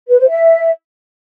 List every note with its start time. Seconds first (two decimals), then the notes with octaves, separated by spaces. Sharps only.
0.09 B4
0.19 C5
0.29 E5